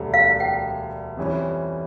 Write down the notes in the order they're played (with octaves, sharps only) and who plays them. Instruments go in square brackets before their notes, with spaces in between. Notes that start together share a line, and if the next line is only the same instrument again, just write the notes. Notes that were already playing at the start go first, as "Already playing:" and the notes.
Already playing: [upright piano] E1 D2 D3 G3
[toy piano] F5
G5
[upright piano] F2 E3 G3 C#4